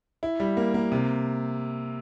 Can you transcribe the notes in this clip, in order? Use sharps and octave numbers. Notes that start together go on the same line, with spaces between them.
E4
G3
A#3
A#3
C3